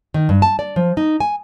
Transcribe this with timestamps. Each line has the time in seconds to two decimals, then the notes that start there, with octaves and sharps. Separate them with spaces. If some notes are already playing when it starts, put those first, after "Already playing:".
0.14 D#3
0.29 G2
0.42 A5
0.59 D5
0.76 F3
0.97 D#4
1.20 G#5